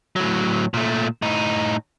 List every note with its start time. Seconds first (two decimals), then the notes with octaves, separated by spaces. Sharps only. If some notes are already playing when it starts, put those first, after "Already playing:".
0.16 A2 F#3
0.74 A#2 A3
1.22 A2 D#4